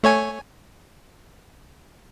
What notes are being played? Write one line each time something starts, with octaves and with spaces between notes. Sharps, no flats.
A3 C#5 G#5